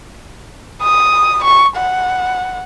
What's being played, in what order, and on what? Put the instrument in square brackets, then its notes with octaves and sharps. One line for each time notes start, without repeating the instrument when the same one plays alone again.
[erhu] D#6
C#6
F#5